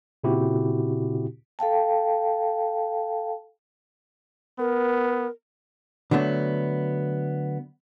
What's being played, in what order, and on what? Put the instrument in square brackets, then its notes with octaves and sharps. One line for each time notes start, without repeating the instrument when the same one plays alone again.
[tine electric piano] A#2 C#3 C4 E4 F#4 G4
[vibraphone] A4 F5 G5 A5
[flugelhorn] B3 [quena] A#4
[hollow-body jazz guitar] D3 F#3 A3 B3